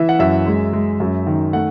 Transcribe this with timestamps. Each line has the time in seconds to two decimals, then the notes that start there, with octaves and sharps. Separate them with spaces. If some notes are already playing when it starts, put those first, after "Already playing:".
Already playing: E3 E5
0.09 F#5
0.19 F#2 E5
0.46 G#3
0.73 G#3
1.00 F#2
1.27 D#3
1.53 A3 F#5